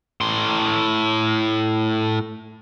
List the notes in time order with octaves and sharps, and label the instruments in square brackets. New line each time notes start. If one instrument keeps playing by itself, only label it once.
[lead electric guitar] A2 C6